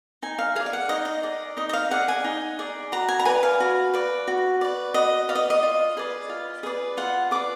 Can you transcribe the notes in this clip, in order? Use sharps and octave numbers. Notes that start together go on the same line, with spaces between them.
D#4 G#5
F5
G#4 D5 F5
F5
F#5
D#4 D#5
D#5
G#4 D5
D#4 D#5
D#5
F5
G#4 D5 F#5
G#5
D#4
G#4 D5
F#4 A#5
G#5
A#5
B4 D5 G#5
F5
F#4
B4 D5
F#4
B4 D5
F#4 D#5
B4 D5 F5
D#5
D#5
F4
G#4 B4 D5
F4
G#4 B4 D5
F4 F#5
G#4 B4 D5 D6